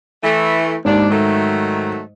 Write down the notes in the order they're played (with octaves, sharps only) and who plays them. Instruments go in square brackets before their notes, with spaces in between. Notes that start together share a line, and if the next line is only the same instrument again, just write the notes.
[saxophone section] E3 A3
[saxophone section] D#2 D4 [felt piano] G#2
[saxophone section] D#3 F#3 A3